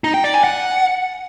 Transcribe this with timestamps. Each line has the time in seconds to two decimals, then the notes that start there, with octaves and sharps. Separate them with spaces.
0.04 D#4
0.14 G5
0.24 D5
0.34 G#5
0.44 F#5